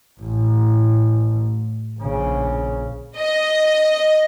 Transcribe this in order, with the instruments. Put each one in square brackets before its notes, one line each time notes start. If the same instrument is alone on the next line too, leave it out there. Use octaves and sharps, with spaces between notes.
[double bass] A1
A#1 C#3
[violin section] D#5